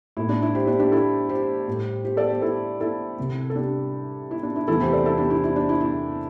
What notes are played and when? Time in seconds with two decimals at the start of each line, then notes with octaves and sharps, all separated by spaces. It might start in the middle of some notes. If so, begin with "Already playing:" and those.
0.17 A2 A3 E4
0.29 D4
0.42 E4
0.55 G4 C5
0.67 D4 G4
0.79 D4 G4
0.92 E4 A4
1.29 G4 C5
1.68 A2 G3
2.04 G4 C5
2.17 A4 D5
2.30 G4 C5
2.42 E4 A4
2.81 E4 A4
3.18 C2 C3 G3
3.50 A4
3.55 D4 G4
4.31 E4
4.43 D4
4.56 E4
4.68 E2 C3 E3 A3 E4 A4
4.80 G4 C5
4.93 A4 D5
5.05 E4 A4
5.18 D4 G4
5.30 E4
5.44 E4
5.56 D4
5.69 E4
5.81 E4